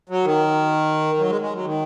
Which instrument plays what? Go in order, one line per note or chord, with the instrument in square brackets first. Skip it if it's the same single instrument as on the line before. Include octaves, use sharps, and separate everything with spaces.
[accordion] F#3
D#3
F#3
G#3
G#3
F#3
D#3